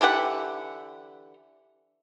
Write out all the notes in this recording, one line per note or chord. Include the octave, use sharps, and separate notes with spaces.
D3 E3 G4 F#5